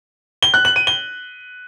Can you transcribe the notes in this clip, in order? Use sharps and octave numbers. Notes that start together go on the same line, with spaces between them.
G7
F#6
F#7
D#7
G7